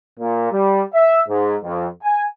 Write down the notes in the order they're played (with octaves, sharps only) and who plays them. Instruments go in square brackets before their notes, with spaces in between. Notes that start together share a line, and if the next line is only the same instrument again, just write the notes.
[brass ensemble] A#2
G3
E5
G#2
F2
G#5